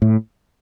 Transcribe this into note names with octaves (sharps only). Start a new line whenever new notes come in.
A2